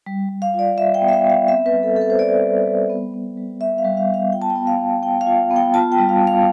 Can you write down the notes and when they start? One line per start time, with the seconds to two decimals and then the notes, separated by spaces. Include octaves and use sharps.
0.06 G3
0.29 G3
0.42 F5
0.54 F4 D5
0.77 G3 E5
0.94 G5
1.01 B3
1.08 E5
1.13 F5
1.24 B3
1.30 F5
1.48 C4 E5
1.66 B4
1.72 G3
1.83 A4
1.96 C4 A4
2.01 B4
2.10 C5
2.19 G3 D5
2.42 G3
2.66 G3
2.90 B3
3.14 B3
3.37 G3
3.61 B3 E5
3.78 F5
3.84 G3
3.97 F5
4.09 B3 F5
4.32 F4 G5
4.42 A5
4.50 G5
4.55 B3
4.67 F5
4.79 B3
5.03 B3 G5
5.21 F5
5.27 F4
5.51 B3
5.56 G5
5.74 F4 A5
5.92 G5
5.98 G3
6.09 F5
6.22 G3
6.27 F5